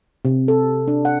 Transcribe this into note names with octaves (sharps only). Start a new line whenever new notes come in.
C3
A4
D4
F#5